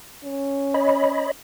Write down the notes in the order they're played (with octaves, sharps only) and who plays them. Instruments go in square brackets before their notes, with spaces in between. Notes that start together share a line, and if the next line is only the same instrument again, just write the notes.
[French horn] C#4
[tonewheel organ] C#5 D#5 B5